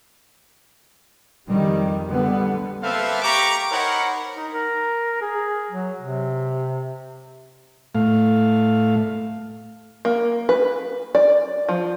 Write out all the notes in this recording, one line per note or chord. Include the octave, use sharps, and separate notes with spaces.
F2 D#3 G3
D3 G3 B3
A#3 C4 A4 B4 E5 F5
G4 G5 A#5 B5 C#6 D6
D#4 A#4 C5 C#5 F#5 B5
D#4
A#4
G#4
F#3
C3
A2 A3 F5
A#3
B4
D5
F3